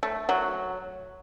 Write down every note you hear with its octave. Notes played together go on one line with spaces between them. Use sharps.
A3
F#3